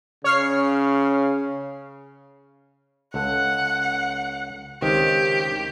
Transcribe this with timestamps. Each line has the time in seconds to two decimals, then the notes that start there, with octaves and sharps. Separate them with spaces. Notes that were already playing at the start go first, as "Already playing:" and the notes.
0.24 C#3 C#5 F6 C7
3.14 C#2 A4 F#5
4.82 C#2 D#3 C4 G4